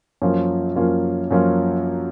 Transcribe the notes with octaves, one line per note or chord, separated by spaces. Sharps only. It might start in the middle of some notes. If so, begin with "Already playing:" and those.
F#2 F3 A#3 C#4 F4
F#2 F3 A#3 C#4 F4
F#2 F3 A#3 C#4 F4